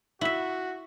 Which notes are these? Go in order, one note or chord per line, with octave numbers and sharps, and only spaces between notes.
E4 F#4 E5